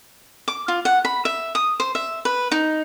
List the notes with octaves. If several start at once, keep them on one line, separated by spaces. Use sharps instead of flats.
D6
F4
F#5
B5
E5
D#6
C5
E5
B4
D#4